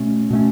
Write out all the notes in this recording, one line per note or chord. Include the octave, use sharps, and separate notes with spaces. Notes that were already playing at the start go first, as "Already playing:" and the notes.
Already playing: B2 A3 C#4
B2 A3 C#4